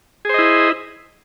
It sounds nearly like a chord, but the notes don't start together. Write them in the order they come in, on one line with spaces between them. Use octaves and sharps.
G#4 C5 D#5 E4